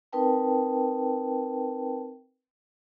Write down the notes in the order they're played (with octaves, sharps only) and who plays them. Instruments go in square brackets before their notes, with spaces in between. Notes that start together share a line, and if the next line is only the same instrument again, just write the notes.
[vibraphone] C4 D#4 A#4 B4 G5 A5